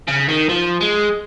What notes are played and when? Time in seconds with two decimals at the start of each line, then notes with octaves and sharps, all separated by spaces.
0.08 C#3
0.29 D#3
0.49 F3
0.81 G#3